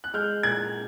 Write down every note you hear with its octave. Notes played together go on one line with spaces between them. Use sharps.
F#6
G#3 F6 G6
A#2 F#6 G#6